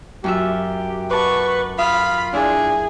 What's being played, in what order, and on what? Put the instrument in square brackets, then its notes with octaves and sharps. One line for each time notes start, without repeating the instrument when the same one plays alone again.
[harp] F#2 F4 E5 [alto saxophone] G4
[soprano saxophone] B4 [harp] F#5 A5 D6 [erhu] C#6
[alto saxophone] F4 [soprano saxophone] F5 [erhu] B5 [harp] D#6
[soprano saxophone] D4 [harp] E4 [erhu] G#4